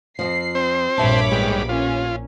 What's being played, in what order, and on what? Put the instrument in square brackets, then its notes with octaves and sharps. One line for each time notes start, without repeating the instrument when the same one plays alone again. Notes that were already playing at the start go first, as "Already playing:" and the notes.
[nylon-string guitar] F2 G#2 F3 [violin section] C7
[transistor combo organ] C4 C5
[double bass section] A#1 A#2 [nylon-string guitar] G2 E5 A5 [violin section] C#5 B5 D6
[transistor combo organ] G#2 G3 [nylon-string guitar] B3 G4
[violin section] C#4 [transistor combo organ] F4